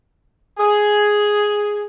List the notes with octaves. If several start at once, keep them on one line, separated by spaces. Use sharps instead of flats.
G#4